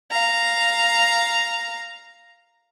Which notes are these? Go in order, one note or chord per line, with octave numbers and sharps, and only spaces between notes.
F5 A#5